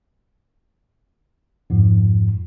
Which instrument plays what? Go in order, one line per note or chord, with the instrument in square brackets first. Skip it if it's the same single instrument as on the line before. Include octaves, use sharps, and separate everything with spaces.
[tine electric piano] F2 G#2 F3